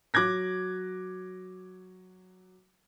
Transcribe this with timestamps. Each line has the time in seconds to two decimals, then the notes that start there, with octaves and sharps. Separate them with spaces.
0.14 F#3 D6 F#6 G#6 A#6